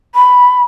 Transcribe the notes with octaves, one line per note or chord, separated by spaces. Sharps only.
B5